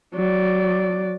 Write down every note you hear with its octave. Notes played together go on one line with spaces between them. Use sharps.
F#3 D5